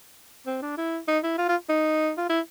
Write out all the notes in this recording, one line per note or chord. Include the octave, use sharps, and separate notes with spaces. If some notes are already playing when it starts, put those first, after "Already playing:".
C4
D4
E4
D#4
E4
F4
F4
D#4
F4
E4